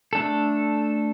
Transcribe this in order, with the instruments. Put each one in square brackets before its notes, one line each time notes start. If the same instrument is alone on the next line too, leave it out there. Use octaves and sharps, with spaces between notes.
[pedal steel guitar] A3 D4 A4